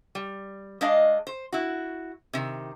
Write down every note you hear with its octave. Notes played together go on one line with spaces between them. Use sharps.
G3
G#3 D4 D5 D#5 F5
C5
E4 F#4
C3 D#3